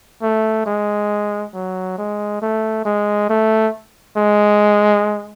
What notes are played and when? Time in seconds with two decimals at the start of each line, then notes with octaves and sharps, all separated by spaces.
0.22 A3
0.66 G#3
1.54 F#3
1.98 G#3
2.42 A3
2.85 G#3
3.30 A3
4.17 G#3